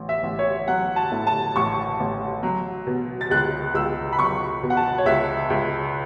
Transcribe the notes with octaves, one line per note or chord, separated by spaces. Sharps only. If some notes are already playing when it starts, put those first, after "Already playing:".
Already playing: A1
E5
A1
C#5
F#3 F#5
A5
A2
A5
A1 C#6
A1
F#3
B2
A6
C#2 F#6
C#2 E6
B5
F#3 C#6
B2
F#5
A5
C#5
C#2 E5
C#2